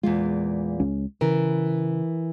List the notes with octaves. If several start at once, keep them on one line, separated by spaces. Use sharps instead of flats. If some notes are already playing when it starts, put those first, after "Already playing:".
E2 A#2 G#3 F4
C#2 G#3 C#4
C#3 E3 A#4